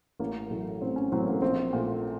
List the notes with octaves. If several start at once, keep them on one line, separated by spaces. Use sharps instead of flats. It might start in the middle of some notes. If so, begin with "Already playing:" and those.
A1 A#3
A2 F#3 A3
A1 C4
C#4
A2 F#3 A3 C4
A#3
A#1 C4
A#2 A3